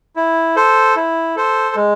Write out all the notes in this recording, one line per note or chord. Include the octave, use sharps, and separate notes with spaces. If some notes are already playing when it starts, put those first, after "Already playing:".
E4
A4 C5
E4
A4 C5
G#3